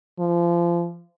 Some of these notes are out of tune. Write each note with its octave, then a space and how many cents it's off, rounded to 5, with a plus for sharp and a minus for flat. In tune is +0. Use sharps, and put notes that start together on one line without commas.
F3 -25